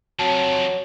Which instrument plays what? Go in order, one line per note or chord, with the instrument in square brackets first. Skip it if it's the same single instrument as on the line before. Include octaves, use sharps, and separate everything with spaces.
[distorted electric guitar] F2 C3 [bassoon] F#3 [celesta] A5